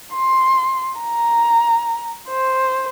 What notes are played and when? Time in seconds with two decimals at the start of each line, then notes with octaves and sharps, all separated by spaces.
0.15 C6
1.00 A#5
2.29 C5